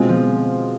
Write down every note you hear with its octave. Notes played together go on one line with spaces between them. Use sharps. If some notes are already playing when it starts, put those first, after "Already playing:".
Already playing: B2 G#3 C4 F4
F3